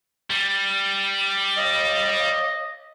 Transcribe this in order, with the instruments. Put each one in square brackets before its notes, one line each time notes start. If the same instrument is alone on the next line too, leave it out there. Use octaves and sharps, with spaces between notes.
[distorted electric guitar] G3
[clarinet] D#5